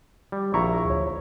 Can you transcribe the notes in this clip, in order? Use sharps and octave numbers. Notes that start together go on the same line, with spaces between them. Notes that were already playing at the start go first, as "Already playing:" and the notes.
G3
A#1 E4 A#5 C#6
D2 C#5